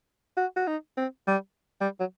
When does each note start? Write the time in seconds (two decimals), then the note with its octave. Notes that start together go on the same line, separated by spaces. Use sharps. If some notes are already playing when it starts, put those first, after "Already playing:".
0.37 F#4
0.56 F#4
0.67 D#4
0.97 C4
1.28 G3
1.81 G3
2.00 F#3